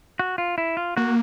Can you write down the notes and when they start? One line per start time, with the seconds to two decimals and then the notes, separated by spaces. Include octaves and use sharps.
0.19 F#4
0.38 F4
0.58 E4
0.77 F4
0.97 A#3 F#4